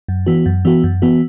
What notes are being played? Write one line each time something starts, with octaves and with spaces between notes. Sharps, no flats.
F#2
E3 B3 F#4
F#2
E3 B3 F#4
F#2
E3 B3 F#4